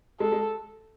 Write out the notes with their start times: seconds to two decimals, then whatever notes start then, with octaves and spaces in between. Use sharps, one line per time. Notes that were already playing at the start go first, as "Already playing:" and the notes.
0.20 G#3 A4
0.32 G#3